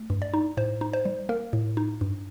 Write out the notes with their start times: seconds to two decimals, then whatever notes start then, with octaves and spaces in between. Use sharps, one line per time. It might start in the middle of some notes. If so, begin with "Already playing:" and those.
Already playing: A3
0.10 G2
0.22 D5
0.34 D#4
0.57 A2 C5
0.81 D#4
0.93 C5
1.05 G3
1.29 A#3 A#4
1.53 A2
1.77 D#4
2.01 G2